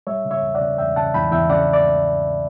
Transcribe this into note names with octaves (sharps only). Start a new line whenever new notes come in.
G3 C#5 E5
C#3
C#5 E5
E2
D5 F#5
C#3
E2 E5 G5
C#3 F#5 A5
E2 G5 B5
E2 E5 G5
C#3 D5 F#5
D5